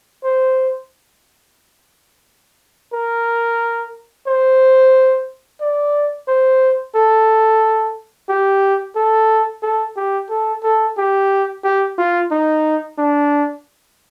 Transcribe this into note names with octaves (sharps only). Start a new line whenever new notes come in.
C5
A#4
C5
D5
C5
A4
G4
A4
A4
G4
A4
A4
G4
G4
F4
D#4
D4